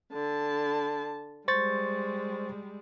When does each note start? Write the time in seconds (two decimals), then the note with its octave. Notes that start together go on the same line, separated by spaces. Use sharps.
0.12 D3 A5
1.48 G3 G#3 C5 C#6 A6